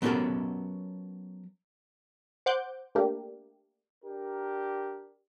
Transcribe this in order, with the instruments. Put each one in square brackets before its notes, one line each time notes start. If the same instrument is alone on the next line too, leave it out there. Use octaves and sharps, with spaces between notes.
[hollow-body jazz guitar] F#3 B3 C#4 G4 A4 A#4
[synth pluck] C5 F#5 D6 F#6 G6
A3 A#3 D4 G4 A#4
[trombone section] D4 G4 A#4